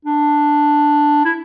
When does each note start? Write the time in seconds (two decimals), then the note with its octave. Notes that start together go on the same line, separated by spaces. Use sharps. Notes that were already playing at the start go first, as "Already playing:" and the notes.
0.05 D4
1.25 E4